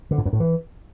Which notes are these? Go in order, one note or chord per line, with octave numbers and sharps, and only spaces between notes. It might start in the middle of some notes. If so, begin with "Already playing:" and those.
D3
A2
F#2
A2
E3